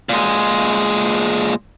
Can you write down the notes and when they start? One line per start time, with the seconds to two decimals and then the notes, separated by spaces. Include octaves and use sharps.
0.09 A#2 G#3